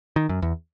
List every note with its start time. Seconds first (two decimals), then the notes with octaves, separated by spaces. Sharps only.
0.16 D#3
0.29 F#2
0.42 E2